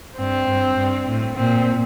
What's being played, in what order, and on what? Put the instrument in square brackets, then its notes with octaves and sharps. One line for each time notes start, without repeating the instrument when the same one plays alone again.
[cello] G2 [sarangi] C4
[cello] G2
G2
A2
[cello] A#2 [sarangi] C4